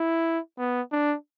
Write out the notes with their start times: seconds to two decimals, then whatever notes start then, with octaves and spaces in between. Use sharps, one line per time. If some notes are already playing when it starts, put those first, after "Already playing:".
Already playing: E4
0.58 B3
0.92 D4